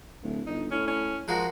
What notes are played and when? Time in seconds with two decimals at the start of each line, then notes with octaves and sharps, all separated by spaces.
0.23 D1
0.47 G1 D#4
0.71 A2 C#4
0.87 C#4
1.28 F3 G#3 F#4 A#4